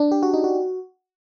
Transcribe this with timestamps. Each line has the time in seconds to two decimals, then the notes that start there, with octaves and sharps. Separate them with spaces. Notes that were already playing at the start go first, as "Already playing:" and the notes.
Already playing: D4
0.12 G4
0.23 F#4
0.34 D#4
0.44 F#4